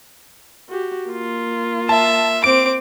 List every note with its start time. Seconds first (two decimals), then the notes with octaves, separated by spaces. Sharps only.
0.69 F#4 G4
1.09 A#3 F4
1.89 E5 A5
2.44 C4 D6 D7